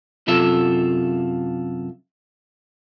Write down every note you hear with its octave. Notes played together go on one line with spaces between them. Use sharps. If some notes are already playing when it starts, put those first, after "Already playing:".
F#2 C3 F4 A4 E5